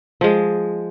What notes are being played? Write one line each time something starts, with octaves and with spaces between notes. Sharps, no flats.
F3 G#3